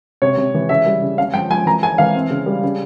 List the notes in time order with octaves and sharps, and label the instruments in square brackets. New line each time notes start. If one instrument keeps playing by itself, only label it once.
[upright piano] C3 C#5
C3
E3
C#3 E5
G3
C#3
C#4 F5
F3 G5
F3 G#5
E3 A#5
G#3 G#5
E3 F5
C4
C#3
G3
C#3